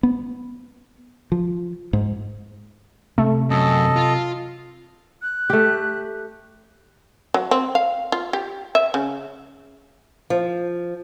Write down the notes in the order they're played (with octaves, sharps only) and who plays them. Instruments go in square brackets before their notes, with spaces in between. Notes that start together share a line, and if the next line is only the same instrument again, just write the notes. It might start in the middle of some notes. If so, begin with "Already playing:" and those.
[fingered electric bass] B3
F3
G#2
[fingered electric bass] C3 [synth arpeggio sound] A3
[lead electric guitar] F#2 [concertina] A4 D#5
[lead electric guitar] F4
[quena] F#6
[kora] A3 G4
[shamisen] F#3
C4
F5
F4
G4
E5
C#3
[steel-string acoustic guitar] F3